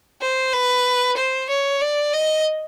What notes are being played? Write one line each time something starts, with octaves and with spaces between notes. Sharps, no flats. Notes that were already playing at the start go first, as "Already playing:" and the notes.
C5
B4
C5
C#5
D5
D#5